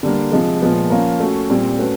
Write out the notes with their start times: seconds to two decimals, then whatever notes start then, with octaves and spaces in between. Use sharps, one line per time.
0.03 D3 G3 A#3
0.32 C3 F3 G#3
0.61 A#2 F3 G#3 B3
0.90 F3 A#3 C#4 F4 A#4
1.20 A3 C#4 F#4
1.49 A#2 G3 C4
1.78 A3 C#4 F#4 B4